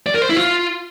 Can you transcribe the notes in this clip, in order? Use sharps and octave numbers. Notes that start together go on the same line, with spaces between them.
D5
A#4
C5
E4
F4